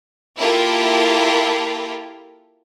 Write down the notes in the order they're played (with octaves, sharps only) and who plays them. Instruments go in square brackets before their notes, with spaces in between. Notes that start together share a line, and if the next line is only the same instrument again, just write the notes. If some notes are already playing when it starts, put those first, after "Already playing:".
[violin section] A#3 E4 F4 G4 A4 A#4